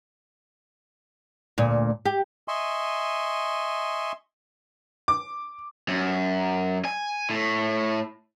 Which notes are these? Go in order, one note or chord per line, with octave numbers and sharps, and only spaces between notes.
D2 A#2
G4
D#5 E5 G#5 C6 C#6
D6
F#2
G#5
A2